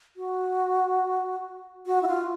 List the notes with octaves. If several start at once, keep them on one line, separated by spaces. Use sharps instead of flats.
F#4
F#4
E4
F4